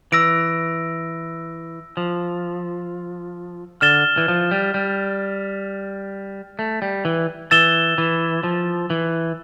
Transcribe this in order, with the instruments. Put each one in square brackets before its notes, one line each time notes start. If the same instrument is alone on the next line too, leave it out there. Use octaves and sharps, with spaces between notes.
[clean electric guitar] E3 [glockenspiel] E6 A#6 D7
[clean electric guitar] F3
[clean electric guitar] D3 [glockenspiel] F6 A6 E7 G7
[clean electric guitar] E3
F3
G3
G3
A3
G3
E3
[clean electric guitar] E3 [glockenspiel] E6 A6 E7 G7
[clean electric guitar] E3
F3
E3